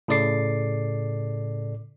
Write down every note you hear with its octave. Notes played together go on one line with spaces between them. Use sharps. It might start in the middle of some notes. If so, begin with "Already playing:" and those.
A2 C#3 A4 D5 D6 C7